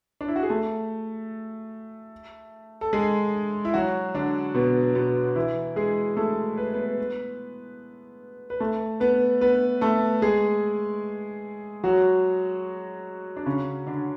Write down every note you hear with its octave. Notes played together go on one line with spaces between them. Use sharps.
D4
E4
F#4
G#4
A3 A4
A4
G#3 G#4
E4
F#3 F#4
D3 D4
B2 B3
B2 B3
E3 E4
G#3 G#4
A3 A4
B4
B3 B4
B4
A3 A4
B3 B4
B3 B4
A3 A4
G#3 G#4
F#3 F#4
D4
C#3 C#4
D3 D4